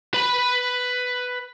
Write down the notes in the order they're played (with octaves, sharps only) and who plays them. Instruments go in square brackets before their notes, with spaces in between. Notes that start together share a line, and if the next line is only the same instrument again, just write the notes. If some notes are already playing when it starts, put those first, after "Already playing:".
[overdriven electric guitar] B4 B5